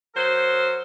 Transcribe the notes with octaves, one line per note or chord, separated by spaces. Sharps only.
F#3 A#4 C5